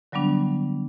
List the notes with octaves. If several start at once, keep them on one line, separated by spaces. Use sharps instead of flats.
D3 F#3 G3 B3 D4